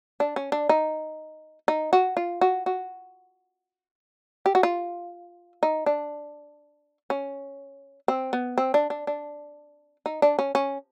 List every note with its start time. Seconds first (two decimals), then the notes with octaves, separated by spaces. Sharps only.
0.20 D4
0.36 C#4
0.52 D4
0.69 D#4
1.68 D#4
1.93 F#4
2.17 F4
2.41 F#4
2.66 F#4
4.46 G4
4.55 F#4
4.63 F4
5.63 D#4
5.86 D4
7.10 C#4
8.08 C4
8.33 B3
8.58 C4
8.74 D4
8.90 D4
9.07 D4
10.06 D#4
10.22 D4
10.39 C#4
10.55 C#4